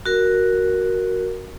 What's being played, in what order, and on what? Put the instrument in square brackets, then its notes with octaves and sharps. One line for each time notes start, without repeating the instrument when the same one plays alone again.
[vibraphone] F#4 A#4